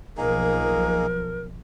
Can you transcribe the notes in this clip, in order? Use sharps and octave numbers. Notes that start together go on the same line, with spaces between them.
B1 F3 A#3 D#4 G#4 A#4